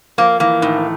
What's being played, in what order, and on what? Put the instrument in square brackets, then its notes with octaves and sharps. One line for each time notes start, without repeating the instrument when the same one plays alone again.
[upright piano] F3 F4 [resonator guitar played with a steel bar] A#3
[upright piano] E3 E4 [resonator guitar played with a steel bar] A#3
[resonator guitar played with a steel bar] A2 [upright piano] D#3 D#4
[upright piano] D#4